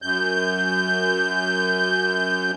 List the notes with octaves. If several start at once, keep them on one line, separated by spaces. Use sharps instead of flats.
F#2 G6